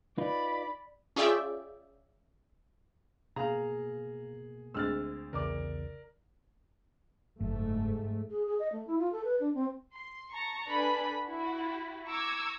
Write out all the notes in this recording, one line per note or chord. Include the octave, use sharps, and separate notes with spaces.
D#4 F4 B4 D5 B5
C#4 F4 G#4 D5 E5 G5
B2 A#3 G#4 F5 A#5
D2 G#3 C4 E6 F6 A6
B1 E2 C#3 A#4 D5 D6
F#1 G#2 A3
G#4
G#4
D#5
A3
E4
F4
A4
B4
D4
C4
C6
A5 A#5 C#6
D4 A4 B4 D5 G#5 B5
E4 F#4
A#5 C#6 D6 E6 G#6